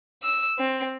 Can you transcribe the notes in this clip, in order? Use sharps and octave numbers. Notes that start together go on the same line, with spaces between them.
E6
C4